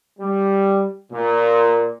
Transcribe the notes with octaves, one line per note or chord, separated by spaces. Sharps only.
G3
A#2